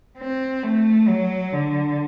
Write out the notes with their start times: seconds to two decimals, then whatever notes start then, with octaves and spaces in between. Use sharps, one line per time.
0.18 C4
0.64 A3
1.08 F#3
1.53 D3